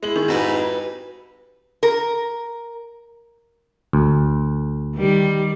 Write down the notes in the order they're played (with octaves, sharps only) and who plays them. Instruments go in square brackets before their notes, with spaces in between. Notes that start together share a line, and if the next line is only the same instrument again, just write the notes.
[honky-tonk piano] G#3 F#7 [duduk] E4
[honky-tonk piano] D#3 G#4
[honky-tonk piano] F2 [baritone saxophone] G#2 [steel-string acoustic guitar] F#4 G4 B4
[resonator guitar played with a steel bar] A#4
[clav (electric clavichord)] D2
[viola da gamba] D#3 G3